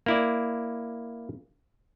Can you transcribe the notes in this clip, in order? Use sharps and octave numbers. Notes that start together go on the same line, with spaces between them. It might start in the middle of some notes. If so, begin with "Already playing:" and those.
A#3 E4 D5